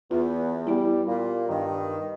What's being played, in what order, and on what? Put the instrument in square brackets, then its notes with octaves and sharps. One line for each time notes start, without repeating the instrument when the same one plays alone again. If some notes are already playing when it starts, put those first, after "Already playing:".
[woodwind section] E2 [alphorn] B3 [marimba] F4
[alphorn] G3 [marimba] B3 E4
[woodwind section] A#2 [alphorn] F4
[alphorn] G2 [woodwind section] D#3